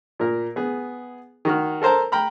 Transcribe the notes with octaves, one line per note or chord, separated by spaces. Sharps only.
A#2 A#4
B3 G#4
D#3 F#4 F6
A4 A#4 C5 A5 A#5
G5 A#5 B5 F6